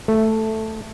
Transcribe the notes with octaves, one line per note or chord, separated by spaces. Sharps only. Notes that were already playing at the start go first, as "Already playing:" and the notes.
A3